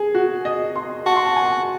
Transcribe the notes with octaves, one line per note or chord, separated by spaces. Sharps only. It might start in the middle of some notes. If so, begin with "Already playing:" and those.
Already playing: G#4
F#4
D#5
C6
F#4 A5
C6
A5
G#5